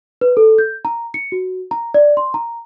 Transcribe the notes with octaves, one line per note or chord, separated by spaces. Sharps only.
B4
A4
G6
A#5
C#7
F#4
A#5
D5
C6
A#5